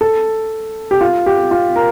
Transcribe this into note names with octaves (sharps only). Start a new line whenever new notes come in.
A4
G4
F4
G4
F4
A#4